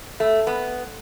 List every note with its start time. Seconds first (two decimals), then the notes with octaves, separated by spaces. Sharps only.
0.20 A3
0.47 B3